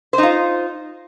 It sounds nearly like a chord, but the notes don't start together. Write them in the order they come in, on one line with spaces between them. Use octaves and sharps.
C5 D#4 F4